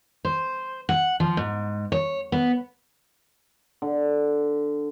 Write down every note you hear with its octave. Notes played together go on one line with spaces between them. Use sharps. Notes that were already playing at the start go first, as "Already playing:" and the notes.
C5
F#5
F3
G#2
C#5
B3
D3